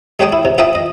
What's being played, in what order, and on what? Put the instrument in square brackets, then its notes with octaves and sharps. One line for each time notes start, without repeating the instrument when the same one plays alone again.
[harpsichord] G#3 G4 C#5 G5 A5 D#6
E4
C3
F4 C5 E5 G5 A5 D#6
D#5